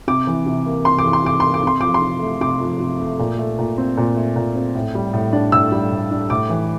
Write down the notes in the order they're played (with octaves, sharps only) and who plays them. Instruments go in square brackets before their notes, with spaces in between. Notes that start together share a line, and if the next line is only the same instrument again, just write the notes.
[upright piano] C3 D6
E3
C3
A#3
C3 C6
D6
E3
C6
C3 D6
A#3 C6
D6
C3 C6
F3 D6
C6
C3
A3
C3 D6
F3
C3
A3
A#2
A3
A#2
C4
A#2
A3
A#2
C4
A2
G3
A2
D4
A2 E6
G3
A2
D4
A2 D6
E3